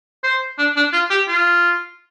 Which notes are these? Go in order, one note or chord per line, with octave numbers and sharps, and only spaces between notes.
C5
D4
D4
F4
G4
F4